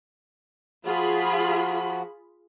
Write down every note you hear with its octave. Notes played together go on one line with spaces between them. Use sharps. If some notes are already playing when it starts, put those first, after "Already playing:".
F3 F4 F#4 G#4 B5